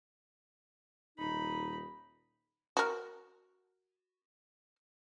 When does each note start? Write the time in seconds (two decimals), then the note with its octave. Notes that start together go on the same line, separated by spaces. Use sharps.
1.19 D#1 D#4 B5
2.77 F#4 A#4